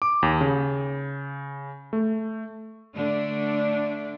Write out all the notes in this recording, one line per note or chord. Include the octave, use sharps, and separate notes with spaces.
D6
D#2
C#3
A3
D3 A3 D4